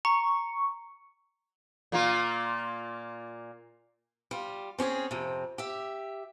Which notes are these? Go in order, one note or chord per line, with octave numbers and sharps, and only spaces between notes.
A#5 C#6
A#2 A#3 F4
G3 F4
C4 C#4 G4 G#4
F2 C3
G4 E5